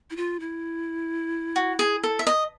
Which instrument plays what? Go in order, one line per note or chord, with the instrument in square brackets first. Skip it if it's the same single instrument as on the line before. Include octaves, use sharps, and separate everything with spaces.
[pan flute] E4
F4
E4
[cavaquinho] F#4
G#4
A4
E5
D#5